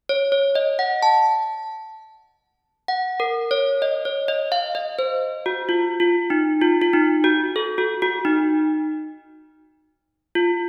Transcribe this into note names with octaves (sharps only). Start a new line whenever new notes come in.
C#5
C#5
D#5
F#5
A5
F#5
A#4
C#5
D#5
C#5
D#5
F5
D#5
C5
F#4
F4
F4
D#4
F4
F4
D#4
F#4
A4
F#4
F#4
D#4
F4